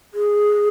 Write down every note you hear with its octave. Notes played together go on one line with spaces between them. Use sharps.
G#4